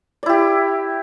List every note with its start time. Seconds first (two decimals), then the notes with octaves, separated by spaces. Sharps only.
0.23 D5
0.26 E4
0.29 G4